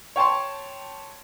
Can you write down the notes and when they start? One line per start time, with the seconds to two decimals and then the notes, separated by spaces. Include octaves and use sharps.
0.16 C#5 G5 A5 C6